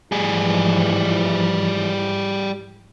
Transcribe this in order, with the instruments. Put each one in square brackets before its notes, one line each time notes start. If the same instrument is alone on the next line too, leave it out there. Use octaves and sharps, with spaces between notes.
[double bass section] G#2 E3 F3 [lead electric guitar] G3 G#4